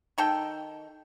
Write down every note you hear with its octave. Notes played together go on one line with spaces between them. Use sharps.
D#3 D#4 A4 G5